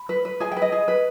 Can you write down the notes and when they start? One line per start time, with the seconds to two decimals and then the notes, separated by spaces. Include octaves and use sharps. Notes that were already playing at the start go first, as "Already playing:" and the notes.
Already playing: B5
0.09 B4
0.25 B4
0.40 G#4 G#5
0.52 G5
0.56 B4
0.62 D#5
0.72 G#4
0.88 B4